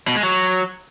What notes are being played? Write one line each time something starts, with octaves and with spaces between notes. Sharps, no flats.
B2
G#3
F#3